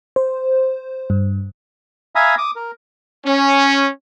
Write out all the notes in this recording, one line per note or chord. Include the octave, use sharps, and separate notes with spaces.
C5
G2
E5 F5 G#5 A#5 B5 D#6
D6 D#6
A#4
C#4